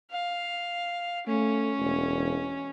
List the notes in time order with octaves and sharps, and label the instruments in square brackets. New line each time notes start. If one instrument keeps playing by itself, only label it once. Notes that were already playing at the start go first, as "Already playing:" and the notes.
[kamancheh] F5
[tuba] A3 [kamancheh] C#4
[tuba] E1